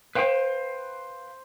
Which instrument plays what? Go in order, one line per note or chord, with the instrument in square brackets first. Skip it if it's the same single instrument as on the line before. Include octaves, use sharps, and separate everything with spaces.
[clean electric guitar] B4 F5 G5 [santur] C5